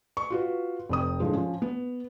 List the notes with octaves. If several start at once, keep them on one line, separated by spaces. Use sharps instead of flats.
C#6
F4 F#4 B4
F1 C4 D#6
A2 D3 F3 G#3
F3 C#4
B3